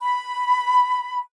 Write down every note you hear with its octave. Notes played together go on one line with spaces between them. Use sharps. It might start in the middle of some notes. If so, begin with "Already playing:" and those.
B5